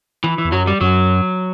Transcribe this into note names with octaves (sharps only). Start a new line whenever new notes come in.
E3
E3
E2
F#2 F#3
G3
F#2 F#3